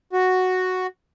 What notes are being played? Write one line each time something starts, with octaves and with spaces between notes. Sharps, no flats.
F#4